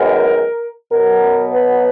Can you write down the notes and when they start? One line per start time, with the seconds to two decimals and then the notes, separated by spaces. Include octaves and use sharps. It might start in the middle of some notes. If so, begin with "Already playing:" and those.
Already playing: F#2 D#3 G#3 B3 A#4
0.92 B2 F#3 B3 A#4
1.52 B4